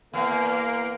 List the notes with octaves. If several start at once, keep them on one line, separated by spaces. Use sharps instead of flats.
E2 A#3